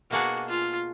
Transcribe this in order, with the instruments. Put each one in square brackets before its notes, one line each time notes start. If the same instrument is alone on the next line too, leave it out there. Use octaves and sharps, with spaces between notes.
[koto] B2 A#3 D4 G#4 [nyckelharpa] F#4
[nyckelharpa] F4